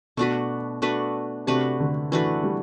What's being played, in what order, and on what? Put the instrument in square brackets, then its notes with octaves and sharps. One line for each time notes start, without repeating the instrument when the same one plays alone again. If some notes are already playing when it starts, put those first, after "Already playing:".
[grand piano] B2 [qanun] A3 D4 F#4 B4
[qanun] A3 D4 F#4 B4
[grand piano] C3 [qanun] A3 D4 F#4 B4
[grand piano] D3
[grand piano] E3 [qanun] A3 D4 F#4 B4
[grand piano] G3